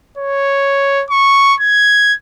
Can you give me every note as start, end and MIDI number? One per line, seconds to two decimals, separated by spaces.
0.17 1.05 73
1.10 1.55 85
1.61 2.14 92